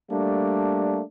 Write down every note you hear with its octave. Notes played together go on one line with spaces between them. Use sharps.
G3 A3 A#3 D4